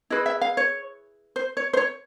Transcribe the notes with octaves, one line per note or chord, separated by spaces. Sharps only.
E4 G#4 B4 D#5
E5
F5
C#5
C5
C#5
C5
C#5